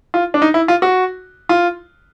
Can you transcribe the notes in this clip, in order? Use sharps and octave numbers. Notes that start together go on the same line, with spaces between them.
F4
D4
D#4
E4
F4
F#4
F4